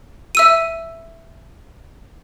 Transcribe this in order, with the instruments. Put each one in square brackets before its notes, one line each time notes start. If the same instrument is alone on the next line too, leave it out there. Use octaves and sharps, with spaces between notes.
[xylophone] E5 E6 D#7